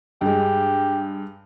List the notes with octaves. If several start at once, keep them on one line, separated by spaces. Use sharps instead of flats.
G2 G#3 G4